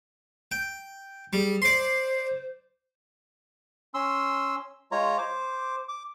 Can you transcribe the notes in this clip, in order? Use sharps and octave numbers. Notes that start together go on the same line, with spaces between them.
G5
G3 G#4
C5 D5 C6
C#4 C6 E6
G#3 F4 C#5 A#5
C5 D6
D6